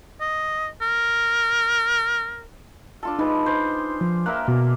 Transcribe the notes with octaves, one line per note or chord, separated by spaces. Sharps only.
D#5
A#4
D4 F4 A4
G#3 D#4 B4
C5
F3
A#3 A#4 E5 F#6
B2